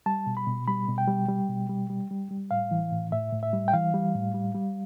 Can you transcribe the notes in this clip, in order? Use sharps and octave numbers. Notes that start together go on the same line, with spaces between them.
G3 A5
B2
B5
B2
G3 B5
B2
G5
G3
G3
B2
G3
G3
G3
G3
A2 F5
E3
A2
A2 E5
A2
E5
G3
G5
E3 F5
G3
A2
G3
G3